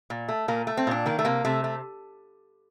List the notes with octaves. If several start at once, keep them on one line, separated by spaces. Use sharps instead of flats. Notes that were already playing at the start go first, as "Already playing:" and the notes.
A#2
A3
A#2 A#3
A3
C4
A#2 D4
D#3 A#3
A3
C3 A#3
C3 A3
A3